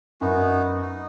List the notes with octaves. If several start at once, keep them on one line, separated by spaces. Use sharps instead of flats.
F#2 B3 D#4 F#4
D#4